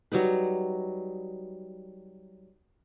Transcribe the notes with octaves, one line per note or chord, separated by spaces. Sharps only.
F#3 G3 D#4 B4